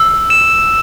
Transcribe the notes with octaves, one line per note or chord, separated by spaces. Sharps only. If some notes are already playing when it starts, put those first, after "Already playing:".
Already playing: E6
E7